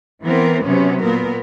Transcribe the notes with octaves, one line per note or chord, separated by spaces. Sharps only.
E3 B3 C4 A#4
C3 F#3 B3 C#4
A#2 B3 A#4